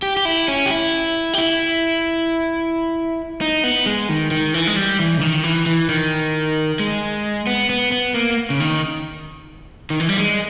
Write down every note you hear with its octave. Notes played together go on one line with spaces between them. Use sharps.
G4
G4
E4
C#4
G4
E4
G4
E4
D#4
B3
G#3
D#3
D#3
E3
G#3
G3
E3
C#3
D#3
E3
E3
D#3
G#3
B3
B3
B3
A#3
C#3
D#3
D#3
E3
G3
G#3